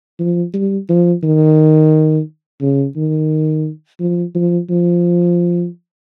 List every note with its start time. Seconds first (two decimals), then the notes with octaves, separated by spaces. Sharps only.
0.19 F3
0.54 G3
0.89 F3
1.23 D#3
2.61 C#3
2.97 D#3
4.00 F3
4.35 F3
4.70 F3